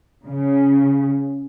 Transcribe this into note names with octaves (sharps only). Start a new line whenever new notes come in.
C#3